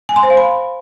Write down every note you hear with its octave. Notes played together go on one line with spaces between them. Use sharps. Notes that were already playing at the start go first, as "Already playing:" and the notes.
G#5
C6
C5
F5
B5